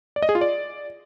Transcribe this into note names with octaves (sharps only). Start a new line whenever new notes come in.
D5
D#5
G#4
F4
D5